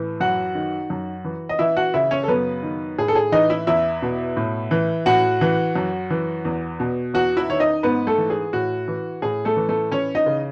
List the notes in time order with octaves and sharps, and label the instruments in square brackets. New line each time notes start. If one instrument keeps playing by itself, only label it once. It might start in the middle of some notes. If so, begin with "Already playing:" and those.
Already playing: [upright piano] A2 E3
F#2 F#4 F#5
D#3
F#2
E3
D#5
E3 E4 E5
F#4 F#5
C#3 E4 E5
C#4 C#5
A4
F#2 B3 B4
D#3
A2 G#4
A4
G#4
E3 D#4 D#5
E4 E5
E2 E4 E5
B2
A2
E3
A2 F#4 F#5
E3
F#2
E3
E2
B2
E2 F#4 F#5
E4 E5
D#3 C#5
D#4 D#5
G#2 B3 B4
A3 A4
E3
G#4
A2 F#4
E3
A2 G#4
A3 A4
E3
A3 A4
E3 C#4 C#5
D#4 D#5
C#3